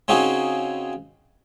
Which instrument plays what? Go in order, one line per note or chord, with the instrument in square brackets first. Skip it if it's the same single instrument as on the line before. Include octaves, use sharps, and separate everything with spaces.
[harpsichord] C#3 C4 D#4 F#4 G#4